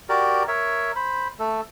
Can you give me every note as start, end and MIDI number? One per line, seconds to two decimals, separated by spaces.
0.09 0.43 66
0.09 0.43 67
0.09 0.43 70
0.09 0.43 74
0.48 0.92 70
0.48 0.92 73
0.48 0.92 76
0.96 1.28 72
0.96 1.28 83
1.39 1.61 57
1.39 1.61 69